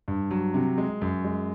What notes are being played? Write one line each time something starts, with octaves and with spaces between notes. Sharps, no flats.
G2
F#3
C3
G#3
F#2
G#3